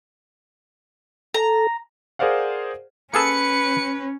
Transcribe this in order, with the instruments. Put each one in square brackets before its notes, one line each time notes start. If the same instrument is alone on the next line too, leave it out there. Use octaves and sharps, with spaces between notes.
[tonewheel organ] A4 [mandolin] A#5
[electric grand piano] G#4 A#4 C5 D5 F5 F#5
[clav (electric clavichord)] A#3 G#4 A4 [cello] C#4 [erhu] B4 [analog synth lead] C#7